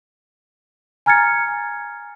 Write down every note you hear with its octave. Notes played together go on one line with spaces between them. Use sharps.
G#5 A#5 F6 G#6 A6 C#7